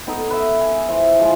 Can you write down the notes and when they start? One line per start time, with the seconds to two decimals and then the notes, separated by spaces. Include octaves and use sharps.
0.07 B3 D#4 A4
0.30 B4 E5
0.61 G#5
0.88 E3 C5
1.19 F3 G#3